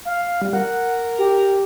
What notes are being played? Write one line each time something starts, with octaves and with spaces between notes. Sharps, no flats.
F5
G3
A#4 F#5
G4